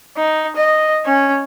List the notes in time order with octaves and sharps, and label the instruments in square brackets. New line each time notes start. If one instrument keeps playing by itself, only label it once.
[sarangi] D#4
D#5
C#4